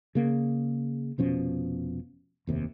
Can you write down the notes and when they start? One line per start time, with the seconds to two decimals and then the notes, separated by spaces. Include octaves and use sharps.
0.15 C#3 A#3
1.18 F1 B2 F3 C#4
2.47 F1 D#2 C3